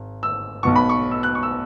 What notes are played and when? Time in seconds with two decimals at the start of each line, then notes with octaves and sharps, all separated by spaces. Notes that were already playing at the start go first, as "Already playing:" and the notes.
Already playing: G#1
0.23 E6
0.63 B1 B2 B3 C#6
0.76 B5
0.89 C#6
1.11 E6
1.23 F#6
1.35 C#6
1.43 E6